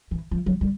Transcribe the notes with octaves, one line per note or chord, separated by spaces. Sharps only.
E3
F3
F#3
G3